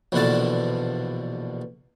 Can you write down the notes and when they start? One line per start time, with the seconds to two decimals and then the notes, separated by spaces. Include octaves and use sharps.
0.12 A#1 E2 B2 D3 A5